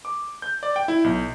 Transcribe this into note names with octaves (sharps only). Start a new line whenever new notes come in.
D6
G6
D5
G5
E4
B1